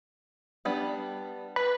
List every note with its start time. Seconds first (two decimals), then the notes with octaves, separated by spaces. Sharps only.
0.65 G3 B3 D4
1.56 B4